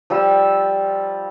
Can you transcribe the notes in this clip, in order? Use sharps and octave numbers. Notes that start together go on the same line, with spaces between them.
F3 G3 E6